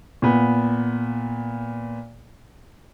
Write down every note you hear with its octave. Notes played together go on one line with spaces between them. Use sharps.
A#2 B3